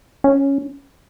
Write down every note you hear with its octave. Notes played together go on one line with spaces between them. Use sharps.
C#4